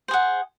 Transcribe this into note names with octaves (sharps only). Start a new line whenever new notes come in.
G#4 C5 F#5